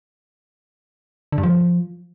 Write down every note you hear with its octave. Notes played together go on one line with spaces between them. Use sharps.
D3
G2
F3